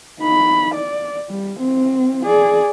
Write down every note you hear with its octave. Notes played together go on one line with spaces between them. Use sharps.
D#4 B5
D5
G3
C4
G#4 D5